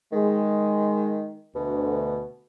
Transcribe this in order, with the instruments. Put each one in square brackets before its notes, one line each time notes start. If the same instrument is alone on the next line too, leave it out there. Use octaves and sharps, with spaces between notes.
[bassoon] D#3 [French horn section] G#3
[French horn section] D2 [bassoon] B2